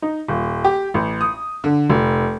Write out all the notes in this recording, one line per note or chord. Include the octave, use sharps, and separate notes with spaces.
D#4
D#1
G4
A1
D#6
D3
F1